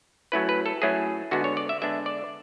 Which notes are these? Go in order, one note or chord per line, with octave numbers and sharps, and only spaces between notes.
F#3 A3 C#4 E4 B4
B4
A4
F#3 A3 C#4 E4 G#4
D3 G#3 B3 D4 F#4
C#5
D5
E5
D3 G#3 B3 D4 E5
D5